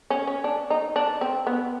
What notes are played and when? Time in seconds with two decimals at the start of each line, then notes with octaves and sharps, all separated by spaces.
0.10 C#4
0.27 C#4
0.44 D4
0.70 D#4
0.96 D4
1.21 C4
1.47 B3